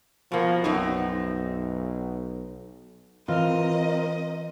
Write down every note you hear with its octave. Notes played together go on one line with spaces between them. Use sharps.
B2 F3 A#3
B1 F#2 C4 D#4
E3 C4 F4 A#4 D#5 F6